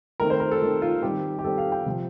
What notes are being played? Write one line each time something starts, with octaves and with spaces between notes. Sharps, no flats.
D#3 A3 C4 A#4
C5
A#4
A4
D#3 A3 C4
F4
D#3 G3 C4 G4
G4
D#3 G3 C4 A4
F5
G5
C3 F3 C4